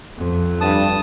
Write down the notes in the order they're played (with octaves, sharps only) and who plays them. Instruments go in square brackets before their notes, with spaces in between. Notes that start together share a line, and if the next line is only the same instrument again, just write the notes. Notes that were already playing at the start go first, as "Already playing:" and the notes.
[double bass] F2
[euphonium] G2 [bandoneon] A5 D#6